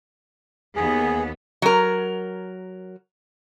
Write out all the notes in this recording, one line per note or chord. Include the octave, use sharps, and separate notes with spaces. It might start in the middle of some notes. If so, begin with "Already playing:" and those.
D#2 B3 G#4
F#3 A#4